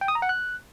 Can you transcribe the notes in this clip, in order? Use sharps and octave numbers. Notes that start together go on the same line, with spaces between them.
G5
D#6
A#5
F#5
F#6